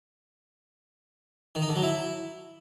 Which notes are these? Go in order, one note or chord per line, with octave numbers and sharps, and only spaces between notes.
D#3
D#4
D3
F#3
E4